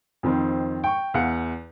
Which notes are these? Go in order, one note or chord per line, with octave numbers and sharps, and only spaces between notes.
F2 D#3 C4
G5 C#6
E2 F5 F#5